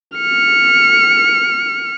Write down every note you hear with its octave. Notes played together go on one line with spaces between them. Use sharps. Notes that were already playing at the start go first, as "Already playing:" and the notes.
F6 C#7